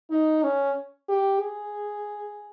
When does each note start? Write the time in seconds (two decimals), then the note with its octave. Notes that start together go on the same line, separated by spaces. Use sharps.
0.11 D#4
0.43 C#4
1.09 G4
1.41 G#4